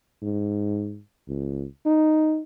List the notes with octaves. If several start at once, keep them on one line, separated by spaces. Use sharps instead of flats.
G#2
C#2
D#4